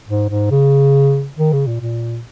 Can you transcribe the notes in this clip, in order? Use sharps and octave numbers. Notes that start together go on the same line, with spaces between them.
G#2
G#2
C#3
D#3
C#3
A#2
A#2